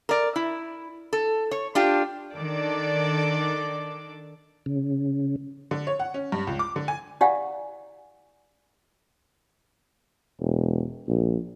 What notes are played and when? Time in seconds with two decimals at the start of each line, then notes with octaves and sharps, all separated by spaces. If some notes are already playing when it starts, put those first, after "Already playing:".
0.09 A#4 D5
0.36 E4
1.13 A4
1.51 C#5
1.75 D4 F4 G4
2.35 D#3 D4 A4 D5 D6
4.66 C#3
5.71 D3
5.87 C#5
6.00 F#5
6.14 C#4
6.32 G2
6.47 C#2
6.59 D6
6.76 D3
6.88 G#5
7.21 E4 G4 D5 F5 F#5 G#5
10.40 E1
11.08 A#1